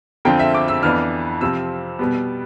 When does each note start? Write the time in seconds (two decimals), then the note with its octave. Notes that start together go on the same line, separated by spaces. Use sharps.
0.25 F2 D3 F3 C4 G5
0.40 E5
0.54 D6
0.68 E6
0.83 F2 E3 B3 D4 F6
1.41 C3 F3 C4 E6
1.99 B2 G3 B3